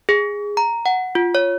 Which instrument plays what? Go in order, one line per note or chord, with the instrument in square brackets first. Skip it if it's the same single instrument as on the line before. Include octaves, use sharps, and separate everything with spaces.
[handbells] G#4
A#5
F#5
F4
C#5